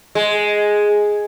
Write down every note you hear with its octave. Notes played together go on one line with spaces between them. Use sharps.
G#3